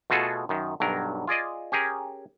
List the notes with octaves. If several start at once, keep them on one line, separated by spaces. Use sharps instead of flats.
B2 A3 F4 F#4 G#4 A4
F#2 D#3
B1 G2 F#3 A#4
F4 G#4 D5 D#5
C#4 G4 G#4 A#4